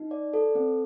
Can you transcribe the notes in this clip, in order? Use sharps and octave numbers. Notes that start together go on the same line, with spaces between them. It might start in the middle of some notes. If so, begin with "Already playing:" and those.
Already playing: D#4
D5
A4
C4